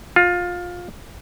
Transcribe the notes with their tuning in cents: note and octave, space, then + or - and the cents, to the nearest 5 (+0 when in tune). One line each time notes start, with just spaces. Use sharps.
F4 +20